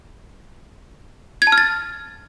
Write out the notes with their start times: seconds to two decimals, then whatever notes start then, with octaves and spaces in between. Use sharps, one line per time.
1.42 G#6
1.47 A5
1.52 F6
1.58 A6